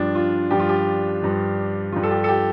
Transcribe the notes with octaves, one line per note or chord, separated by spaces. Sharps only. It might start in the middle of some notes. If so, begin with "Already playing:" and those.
Already playing: G2 F3 D4
F4
G2 F3 G4
F4
G4
G2 F3
G2 F3 F4
A4
G4
A4
G4